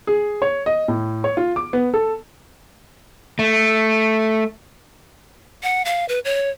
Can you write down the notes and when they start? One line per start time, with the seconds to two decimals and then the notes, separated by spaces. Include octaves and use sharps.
0.07 G#4
0.42 C#5
0.66 D#5
0.88 A2
1.24 C#5
1.37 F4
1.56 D6
1.73 B3
1.94 A4
3.39 A3
5.63 F#5
5.85 F5
6.09 B4
6.25 C#5